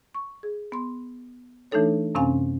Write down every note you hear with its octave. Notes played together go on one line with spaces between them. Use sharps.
C#6
G#4
B3 C6
E3 A3 D4 D#4 A4 C#5
F#2 C3 C4 C#4 F5 G#5